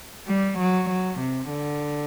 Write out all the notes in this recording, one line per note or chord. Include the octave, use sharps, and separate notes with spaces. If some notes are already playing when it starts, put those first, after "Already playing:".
G3
F#3
F#3
C3
D3